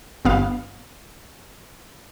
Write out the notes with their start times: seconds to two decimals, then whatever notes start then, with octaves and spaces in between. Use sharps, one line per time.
0.25 G1 B3 F5